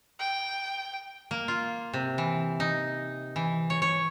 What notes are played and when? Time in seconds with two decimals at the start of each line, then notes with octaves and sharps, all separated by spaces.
0.20 G5
1.31 A#3
1.48 F4
1.93 C3
2.18 E3
2.60 D#4
3.36 E3
3.70 C#5
3.82 C#5